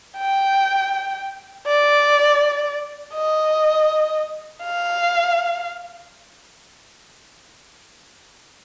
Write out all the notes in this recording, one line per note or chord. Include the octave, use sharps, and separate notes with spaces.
G5
D5
D#5
F5